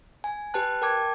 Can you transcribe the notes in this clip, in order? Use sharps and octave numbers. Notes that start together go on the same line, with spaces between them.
G#5
G4 B4 G5 A5 F#6
A#4 G5 A5 D6 G#6